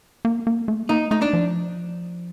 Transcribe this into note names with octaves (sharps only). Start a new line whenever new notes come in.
A#3
A#3
A3
A#3 D#4
A3 D#4
D4
F3